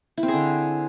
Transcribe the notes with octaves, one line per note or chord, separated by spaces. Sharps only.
E4
C4
G#4
D3